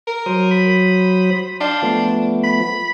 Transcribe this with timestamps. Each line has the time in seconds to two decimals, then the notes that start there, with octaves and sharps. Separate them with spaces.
0.07 A#4
0.26 F#3 C5 D#6
0.51 B5
1.61 D4 F5 G5 C6
1.82 F3 A3 B3
2.44 B5